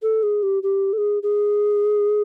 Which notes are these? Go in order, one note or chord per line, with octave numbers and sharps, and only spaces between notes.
A4
G#4
G4
G4
A4
G#4
G#4